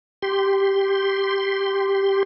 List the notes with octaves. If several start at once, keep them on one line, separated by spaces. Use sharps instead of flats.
G4 C6